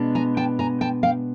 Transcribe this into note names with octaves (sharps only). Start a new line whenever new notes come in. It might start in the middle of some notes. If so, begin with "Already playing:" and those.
Already playing: B2 G#3 B3 D4
G#5 A#5
G5 A5
G#5 A#5
G5 A5
F5 G5